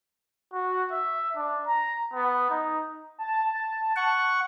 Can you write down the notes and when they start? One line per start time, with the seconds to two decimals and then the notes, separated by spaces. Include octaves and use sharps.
0.54 F#4
0.92 E5
1.36 D4
1.67 A#5
2.14 B3
2.50 D#4
3.19 A5
3.96 F#5 C#6